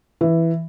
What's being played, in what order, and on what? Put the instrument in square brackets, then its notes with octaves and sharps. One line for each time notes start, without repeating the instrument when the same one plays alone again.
[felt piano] E3